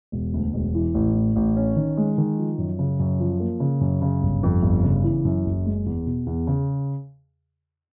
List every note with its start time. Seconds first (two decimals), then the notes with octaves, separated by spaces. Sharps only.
0.12 E1
0.34 D2
0.54 E1
0.75 E3
0.94 A1
1.15 A2
1.36 A1
1.56 C#4
1.76 D#3
1.97 G#3
2.18 D#3
2.38 F3
2.58 F#2
2.79 C#3
3.00 F#2
3.20 F3
3.40 A#3
3.60 C#3
3.81 F#2
4.02 C#3
4.22 G1
4.43 F2
4.63 G1
4.84 C#3
5.04 E3
5.25 F#2
5.45 F#1
5.66 G#3
5.86 E2
6.06 B2
6.27 E2
6.47 C#3